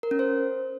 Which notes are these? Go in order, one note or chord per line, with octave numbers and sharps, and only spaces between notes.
A#4
C#4
C5